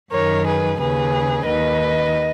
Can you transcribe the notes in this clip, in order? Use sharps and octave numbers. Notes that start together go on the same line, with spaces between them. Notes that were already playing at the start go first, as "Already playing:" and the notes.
F#2 D#3 A#4 C#5
G#4 B4
D#2 C#3 G#4 B4
D#2 D#3 B4 D#5